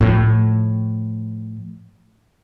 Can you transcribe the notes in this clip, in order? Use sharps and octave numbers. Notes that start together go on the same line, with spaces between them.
A2 F3